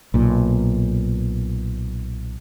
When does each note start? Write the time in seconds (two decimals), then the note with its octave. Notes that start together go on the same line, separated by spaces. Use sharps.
0.14 B1 A#2